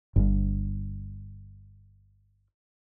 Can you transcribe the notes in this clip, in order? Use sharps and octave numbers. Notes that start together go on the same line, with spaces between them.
G1 G2